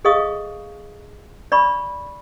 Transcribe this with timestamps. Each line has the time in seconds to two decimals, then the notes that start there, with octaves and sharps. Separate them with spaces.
0.05 G#4 A4 D#5 F5 C#6 D#6
1.52 D5 B5 C#6